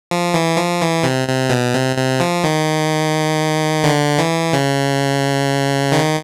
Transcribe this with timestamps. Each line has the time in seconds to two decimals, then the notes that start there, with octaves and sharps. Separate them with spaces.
0.11 F3
0.34 E3
0.57 F3
0.81 E3
1.04 C3
1.28 C3
1.50 B2
1.74 C3
1.96 C3
2.20 F3
2.44 D#3
3.84 D3
4.18 E3
4.53 C#3
5.92 D#3